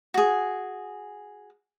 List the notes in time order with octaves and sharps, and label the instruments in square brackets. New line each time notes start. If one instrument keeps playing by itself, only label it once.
[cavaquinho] F#4 G#4